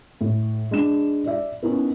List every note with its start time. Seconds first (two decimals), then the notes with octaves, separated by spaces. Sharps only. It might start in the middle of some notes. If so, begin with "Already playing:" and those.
0.21 A2
0.71 G#3 D4 E7
1.26 D5 E5
1.63 B3 C#4 D#4 E4 A#4